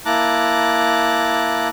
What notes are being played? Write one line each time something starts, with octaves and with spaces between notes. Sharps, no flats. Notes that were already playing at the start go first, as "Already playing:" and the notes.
A#3 E4 A5 A#5 D6 F#6